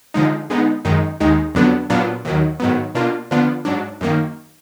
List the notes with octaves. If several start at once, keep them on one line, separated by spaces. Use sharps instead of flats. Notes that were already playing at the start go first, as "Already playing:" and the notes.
D3 F3 G#3 D#4
D3 G#3 B3 D#4
F#2 D#3 G#3 D#4
D#2 D#3 G#3 D#4
F2 D3 F#3 B3 D4
A#2 F#3 B3 D4 F4
D#2 D#3 F#3
G#2 D#3 F#3 B3
B2 A#3 D4 F4
D3 F3 B3 D4 F4
G#2 F#3 D4
F#2 D#3 A#3